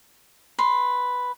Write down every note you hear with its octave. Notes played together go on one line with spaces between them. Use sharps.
B4 C6